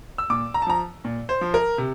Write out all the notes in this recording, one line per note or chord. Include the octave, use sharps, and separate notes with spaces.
E6
A#2 D6
A#5
A5
F3 A#5
A#2
C5
F3
A#4
C3